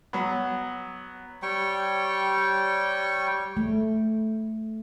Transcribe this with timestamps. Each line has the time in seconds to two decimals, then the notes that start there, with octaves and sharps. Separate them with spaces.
0.13 F#3 B3
1.42 G3 C#5 G5 C#6
3.57 A3